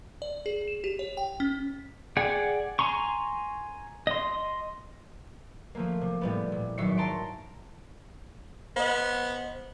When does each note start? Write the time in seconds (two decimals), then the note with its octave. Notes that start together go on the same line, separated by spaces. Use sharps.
0.22 D5
0.46 G#4
0.68 E7
0.84 G4
0.99 C#5
1.17 G5
1.40 C#4
2.17 G#4 D5 F#5 G5
2.79 G#5 A#5 C6 C#6
4.07 D#5 C6
5.75 F3 A3 A#3
6.01 C3
6.21 A2 G3 B3
6.52 A#2
6.78 G#1 F#3 E5 C7 C#7
6.97 A5 A#5 C6 C#7 D7
8.76 B3 C5 D#5